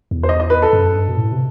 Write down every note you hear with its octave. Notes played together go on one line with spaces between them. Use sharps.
E2
C5
D#5
D#5
B4
A4
F#2
G2
B2
A2
C3